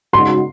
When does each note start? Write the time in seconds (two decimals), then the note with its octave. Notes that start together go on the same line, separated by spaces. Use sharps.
0.13 C#3 G#3 D#4 F#4 C6